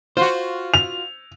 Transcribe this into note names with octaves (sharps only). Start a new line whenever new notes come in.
F4 F#4 C5
F7